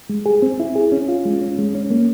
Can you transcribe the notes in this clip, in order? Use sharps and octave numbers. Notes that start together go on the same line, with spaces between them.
G#3
G#4
C4
E4
G#4
C#4
F4
G#3
C#4
G#3
C#4
A#3